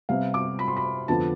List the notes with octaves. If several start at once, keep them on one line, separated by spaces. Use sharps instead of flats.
C3 G3 B3 F5
D6
B5
C6
B5
F2 D3 F3 B3 A5